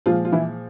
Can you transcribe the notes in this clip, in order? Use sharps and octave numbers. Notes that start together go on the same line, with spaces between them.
A#2 F3 G#3 F4
F4
E3 E4